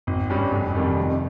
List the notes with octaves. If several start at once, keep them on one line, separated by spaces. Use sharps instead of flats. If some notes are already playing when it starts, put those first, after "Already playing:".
G#1
G2 G3 C#4
F1
F2 D#3 G3
C3